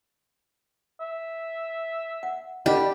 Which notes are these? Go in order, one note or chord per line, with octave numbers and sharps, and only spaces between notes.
E5
F#5
G3 D4 G4 D#5 F#5